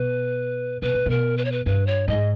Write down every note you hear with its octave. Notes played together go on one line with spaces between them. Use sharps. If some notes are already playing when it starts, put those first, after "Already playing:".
Already playing: B2 B4
B2 B4
A#2
B2 A#4
B4
C#5
B4
G2 B4
C#5
G#2 D#5